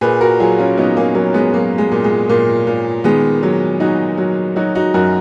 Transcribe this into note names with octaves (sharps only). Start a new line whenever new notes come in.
A#2 G#4 B4
F#4 A#4
F#3 F4 G#4
C#4 F4
F#3 B3 D#4
A#3 C#4
F#3 A#3
G#3 B3
F#3 A#3
G#3
A#2
G#3
A#2 A#3
A#2
D#3 G#3 B3
F#3
F#3 D#4 F#4
F#3
F#3 D#4 F#4
D#4 F#4
F#2 F#4 A#4